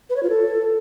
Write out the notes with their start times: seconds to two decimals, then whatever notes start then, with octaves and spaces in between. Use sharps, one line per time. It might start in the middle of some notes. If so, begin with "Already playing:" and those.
0.10 B4
0.16 C#5
0.23 F4
0.30 A4